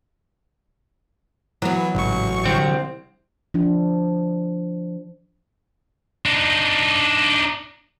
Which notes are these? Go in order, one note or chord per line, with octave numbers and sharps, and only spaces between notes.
E3 F#3 B3
A1 G#2 C#3 C#6
C2 D3 F3 C4
F3 D4
D4 D#4